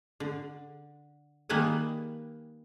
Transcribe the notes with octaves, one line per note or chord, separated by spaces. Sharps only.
D3
D#3 G3 A#3 B4 D#5 G#5